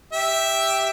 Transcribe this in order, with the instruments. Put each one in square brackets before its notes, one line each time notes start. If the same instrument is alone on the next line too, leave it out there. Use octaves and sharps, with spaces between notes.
[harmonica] G4 E5